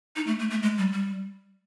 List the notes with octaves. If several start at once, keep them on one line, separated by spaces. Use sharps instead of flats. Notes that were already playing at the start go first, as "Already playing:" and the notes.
D#4
A3
A3
A3
G#3
G3
G3